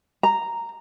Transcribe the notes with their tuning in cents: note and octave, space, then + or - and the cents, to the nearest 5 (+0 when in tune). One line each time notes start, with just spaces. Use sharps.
A#5 -5